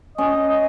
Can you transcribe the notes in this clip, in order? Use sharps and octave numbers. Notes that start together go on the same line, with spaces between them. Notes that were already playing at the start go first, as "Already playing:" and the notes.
C#4 D#5
D#5